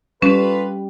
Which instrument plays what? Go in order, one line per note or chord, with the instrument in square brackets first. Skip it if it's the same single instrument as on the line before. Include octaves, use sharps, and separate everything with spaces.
[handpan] G3 [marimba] C#4 [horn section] F4 A4 B4